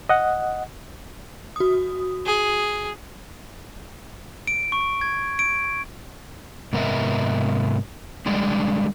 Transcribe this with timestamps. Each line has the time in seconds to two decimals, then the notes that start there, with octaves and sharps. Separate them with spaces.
0.09 D#5 F#5
1.56 F#4 D#6
2.26 G#4
4.47 D7
4.72 C#6
5.01 G#6
5.39 D7
6.73 G#2 C3 B3 A#4 D#5 E5
8.26 D3 G3 G#3 D4 G4